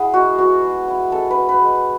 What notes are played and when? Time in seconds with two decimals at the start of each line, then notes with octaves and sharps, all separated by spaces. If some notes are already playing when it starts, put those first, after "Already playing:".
Already playing: E4 G#4 F#5
0.14 G#3 F#4
0.38 B3 F#4
0.64 G#3
0.88 E4
1.12 G#3 A4
1.31 B4
1.37 B3
1.49 B4
1.62 G#3